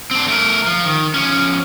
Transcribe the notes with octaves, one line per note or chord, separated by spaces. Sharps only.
C4 D4
A3 A#4
F3
D#3
F3 C#4